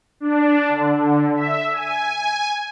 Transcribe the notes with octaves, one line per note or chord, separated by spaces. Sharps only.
D4
D3
E5
G#5
G#5